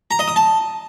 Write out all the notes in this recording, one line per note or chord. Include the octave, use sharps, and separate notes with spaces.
A#5
D#5
D#6
A5